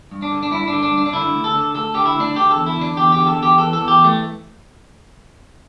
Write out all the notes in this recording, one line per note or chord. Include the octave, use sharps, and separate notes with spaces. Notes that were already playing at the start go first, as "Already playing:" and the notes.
G2
D4
D3
D4
G2 E4
D4
D3
D4
G2 D4
D4
D3 E4
D2
A4
D3
D2 A4
D3 G4
E4
D2
D4
D3 G4
E2 A4
E4
D3 D4
E2 G4
D3 G4
A4
E2
G4
E3 A4
A4
E2
G4
E3
A3